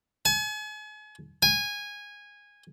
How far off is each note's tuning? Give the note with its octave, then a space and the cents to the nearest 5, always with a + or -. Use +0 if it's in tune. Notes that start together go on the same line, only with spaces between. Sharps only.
G#5 +40
G#5 -15